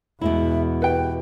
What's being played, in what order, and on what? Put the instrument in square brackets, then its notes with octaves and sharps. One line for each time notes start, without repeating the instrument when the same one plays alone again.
[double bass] E2 [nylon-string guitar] B2 G#3 E4 [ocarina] E5
[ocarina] G4 [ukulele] B4 G5